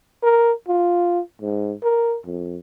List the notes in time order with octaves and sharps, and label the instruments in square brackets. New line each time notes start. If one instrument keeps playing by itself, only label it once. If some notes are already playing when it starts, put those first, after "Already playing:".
[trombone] A#4
F4
G#2
A#4
F2